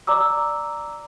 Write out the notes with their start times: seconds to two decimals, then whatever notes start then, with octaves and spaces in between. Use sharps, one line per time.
0.07 D5 A#5 D6 E6